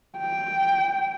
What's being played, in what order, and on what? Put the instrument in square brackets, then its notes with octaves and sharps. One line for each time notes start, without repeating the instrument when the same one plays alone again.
[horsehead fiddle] G5